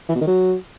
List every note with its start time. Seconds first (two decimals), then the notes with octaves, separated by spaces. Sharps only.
0.09 E3
0.15 B2
0.21 D#3
0.27 F#3